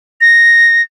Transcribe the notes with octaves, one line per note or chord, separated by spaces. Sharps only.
A#6